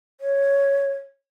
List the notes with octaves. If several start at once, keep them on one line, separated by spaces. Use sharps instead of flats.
C#5